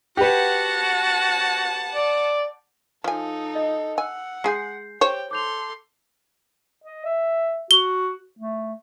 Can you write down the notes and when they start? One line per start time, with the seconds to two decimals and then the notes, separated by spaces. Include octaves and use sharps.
0.17 F#4 G4 B4 F#5 A5
1.94 D5
3.04 F3 D#4 A4 G#5
3.55 D#5
3.98 F#5 G#5 E6
4.44 G#3 G#4 G6 C7
5.01 G4 C5 C#5 G5
5.31 A4 C6 D6 G6 F7
6.83 D#5
7.05 E5
7.71 F#4 G7
8.39 A3